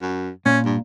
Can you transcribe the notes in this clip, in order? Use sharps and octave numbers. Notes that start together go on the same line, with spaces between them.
F#2
A#2 C#4
G2